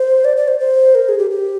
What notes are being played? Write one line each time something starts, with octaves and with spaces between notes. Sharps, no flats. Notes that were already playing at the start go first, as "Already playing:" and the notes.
Already playing: C5
D5
D5
C5
C5
A#4
G#4
G4
G4